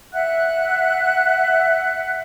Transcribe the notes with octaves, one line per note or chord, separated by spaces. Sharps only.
E5 F#5 F#6